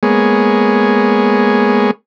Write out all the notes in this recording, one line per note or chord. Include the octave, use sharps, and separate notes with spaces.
G#3 A#3 B3 G#4 C#5